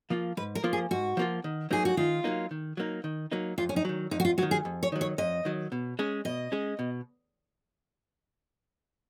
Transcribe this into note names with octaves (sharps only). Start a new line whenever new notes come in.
F3 A#3 F4
G#2 B4
A#4
F3 A#3 F4
G#4
G#2 F#4
F3 A#3 F4
D#3
F#3 A#3 D#4 G#4
F#4
D#3 F4
F#3 A#3 D#4
D#3
F#3 A#3 D#4
D#3
F#3 A#3 D#4
F2 F4
C#4
D#4
D#3 F#3
F2 D#4
F#4
F4
D#3 F#3 F#4
G#4
F2
C#5
D#3 F#3
C#5
F2 D#5
D#3 F#3
B2
G#3 C#4 G#4
B2 D#5
G#3 C#4 G#4
B2